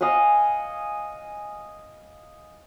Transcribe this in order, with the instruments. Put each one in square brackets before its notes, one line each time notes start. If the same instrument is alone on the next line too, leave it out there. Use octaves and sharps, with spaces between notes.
[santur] D#5 F5 F#5 G#5